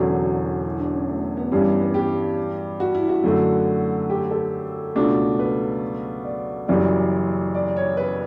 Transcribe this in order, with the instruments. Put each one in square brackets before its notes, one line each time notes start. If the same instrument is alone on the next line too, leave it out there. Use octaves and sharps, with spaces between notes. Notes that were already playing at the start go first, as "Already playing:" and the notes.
Already playing: [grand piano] E1 E2 D3 F#3 [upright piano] C#4
[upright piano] E4
D4
C#4
A3
B3
[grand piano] G2 E3 G3 [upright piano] C#4
[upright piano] B3
B3
G4
F#4
E4
F#4
[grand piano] F#2 D3 A3
[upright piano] G4
A4
[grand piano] C#2 B2 A3 D4
[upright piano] B4
D5
[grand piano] F#1 F#2 E3 G3 [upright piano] D5
[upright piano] D5
C#5
B4